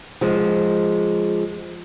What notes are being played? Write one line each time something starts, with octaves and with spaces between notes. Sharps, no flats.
F3 G#3